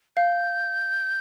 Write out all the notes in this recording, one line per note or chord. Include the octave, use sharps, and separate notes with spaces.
F5 G6